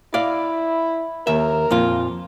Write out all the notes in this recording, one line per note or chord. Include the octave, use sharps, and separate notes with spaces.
E4 D5 F5
D#2 A#4 E5
F2 A#2 F4